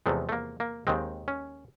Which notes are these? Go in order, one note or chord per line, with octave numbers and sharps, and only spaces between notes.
E2 C3 F3 G#3 A3
A3
A#3
A#3
D#2 D#3 G#3 C4
C#4